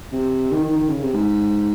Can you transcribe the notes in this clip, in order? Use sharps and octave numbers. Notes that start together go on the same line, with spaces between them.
C3
D#3
D#3
D#3
C#3
C3
G#2